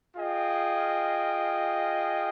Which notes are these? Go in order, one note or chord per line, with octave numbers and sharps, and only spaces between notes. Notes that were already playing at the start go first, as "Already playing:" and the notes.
F4 G#4 D#5 G5